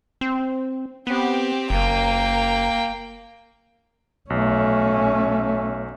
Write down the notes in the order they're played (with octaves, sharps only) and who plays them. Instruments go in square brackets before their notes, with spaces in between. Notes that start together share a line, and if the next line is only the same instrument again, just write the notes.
[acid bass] C4
[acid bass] B3 [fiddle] C4 G4
[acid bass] F#1 [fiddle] A#3 G5
[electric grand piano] B1 [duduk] A3 [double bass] C#4